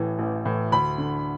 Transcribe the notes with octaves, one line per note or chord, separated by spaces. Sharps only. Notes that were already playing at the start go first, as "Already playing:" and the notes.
Already playing: A1 A2 E3
A1
A2 E3
D2 B5
D3